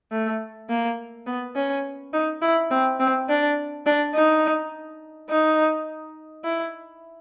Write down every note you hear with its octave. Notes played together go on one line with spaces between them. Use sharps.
A3
A#3
B3
C#4
D#4
E4
C4
C4
D4
D4
D#4
D#4
E4